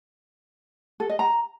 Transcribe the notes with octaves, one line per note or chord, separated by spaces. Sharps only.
A4
D#5
A#5